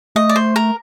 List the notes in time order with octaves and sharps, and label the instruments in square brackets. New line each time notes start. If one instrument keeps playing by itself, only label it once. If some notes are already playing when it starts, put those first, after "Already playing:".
[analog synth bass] A3 [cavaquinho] D#5
[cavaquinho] D5
C5
A#4